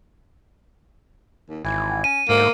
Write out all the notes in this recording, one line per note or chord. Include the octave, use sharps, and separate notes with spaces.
D#2
G#1 E3
C#4 D#7
D2 G#2 A#3